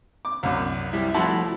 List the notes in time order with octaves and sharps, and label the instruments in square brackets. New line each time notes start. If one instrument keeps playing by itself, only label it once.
[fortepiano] D6
C2 F#2
[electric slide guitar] G3 E4
[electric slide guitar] F3 A3 F#4 [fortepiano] E4 A5 C6